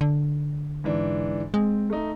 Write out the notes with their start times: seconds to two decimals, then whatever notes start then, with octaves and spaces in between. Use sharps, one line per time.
0.01 D3
0.84 G#2 E3 D4
1.54 G#3 C4
1.90 A3 D#4